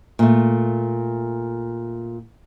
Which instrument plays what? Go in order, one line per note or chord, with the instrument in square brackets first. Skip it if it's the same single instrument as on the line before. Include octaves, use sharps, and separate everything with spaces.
[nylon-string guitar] A#2 A3